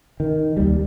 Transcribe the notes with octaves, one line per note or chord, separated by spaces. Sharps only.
D#3
D#2 G3